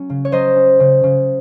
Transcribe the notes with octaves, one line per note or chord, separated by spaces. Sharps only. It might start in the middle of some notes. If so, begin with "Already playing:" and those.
Already playing: F#3 C#4
C#3
C#5
F#3 C5 D#5
C#4
C#3
C#3